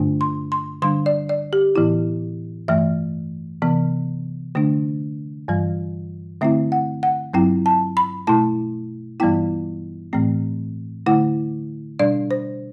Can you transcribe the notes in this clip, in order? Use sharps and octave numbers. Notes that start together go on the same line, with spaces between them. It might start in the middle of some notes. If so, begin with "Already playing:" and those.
Already playing: G2 D3 A3 D4
C6
C6
D3 G3 D4 C6
D5
D5
G4
A2 E3 B3 E4
G2 E3 A3 E5
C3 E3 B3
D3 A3 D4
G2 E3 G3
D3 A3 C4 E4 E5
F#5
F#5
G2 F#3 C4 E4 G5
A5
B5
B2 A3 E4 A5
G2 E3 G3 B3 E4 G5
A2 E3 A3 C4
D3 A3 E4 F#5
B2 G3 D4 D5
C5